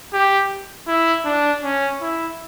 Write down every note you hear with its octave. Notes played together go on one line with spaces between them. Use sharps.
G4
E4
D4
C#4
E4